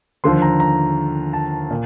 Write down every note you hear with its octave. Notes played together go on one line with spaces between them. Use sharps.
D#2 D3 F3 C6
A#5
A#5
A5
A#2